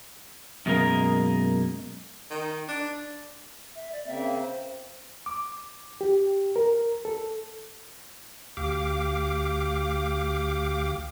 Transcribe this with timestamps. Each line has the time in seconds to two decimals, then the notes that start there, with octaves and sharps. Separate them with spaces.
0.66 F#2 B2 G#3 A#3 A#4
2.30 D#3
2.68 D4
3.75 E5
3.92 D5
4.06 C#3 A#3 C4 E5
4.42 C5
5.26 D6
6.01 G4
6.56 A#4
7.05 A4
8.57 D2 G4 F5 D6